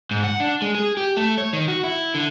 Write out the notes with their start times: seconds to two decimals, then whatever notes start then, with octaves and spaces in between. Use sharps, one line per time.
0.11 G#2
0.24 F#5
0.40 D4
0.62 G#3
0.75 G#4
0.97 G4
1.17 A3
1.38 C#5
1.53 D#3
1.68 F#4
1.84 E4
2.14 D3